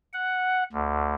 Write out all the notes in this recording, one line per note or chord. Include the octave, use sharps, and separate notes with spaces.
F#5
D2